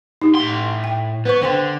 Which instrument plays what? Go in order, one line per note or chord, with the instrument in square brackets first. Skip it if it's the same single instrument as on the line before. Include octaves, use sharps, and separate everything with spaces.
[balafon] D#4 G4
[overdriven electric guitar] A2 C6
[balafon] G5
[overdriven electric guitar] B3 [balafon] B4 C5 C#6
[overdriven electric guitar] D3 [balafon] C5 G5 C6